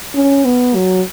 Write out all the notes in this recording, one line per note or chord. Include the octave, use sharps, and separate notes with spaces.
C#4
B3
F#3